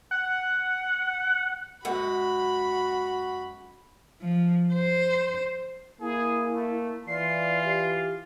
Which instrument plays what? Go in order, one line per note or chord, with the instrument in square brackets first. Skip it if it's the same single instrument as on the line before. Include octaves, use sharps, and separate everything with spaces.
[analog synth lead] F#5
[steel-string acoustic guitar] F#2 G#3 F#5 [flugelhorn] F#4 [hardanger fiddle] B5
[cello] F3
C5
[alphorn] A#3 [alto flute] E4 [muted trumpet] G#4
[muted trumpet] A3
[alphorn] E3 [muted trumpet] F4 [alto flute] D5 [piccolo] C7
[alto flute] G4